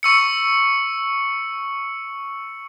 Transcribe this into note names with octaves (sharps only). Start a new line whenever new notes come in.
C#6 E6 C#7